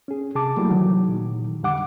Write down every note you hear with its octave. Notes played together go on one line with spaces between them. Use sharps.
C#4 G#4
C3 G#4 A5 D6
F#3 G3 A3 A#3 E4
D#3 E3 F#3
A#2 D#3
F2 D3 G3 F#5 D6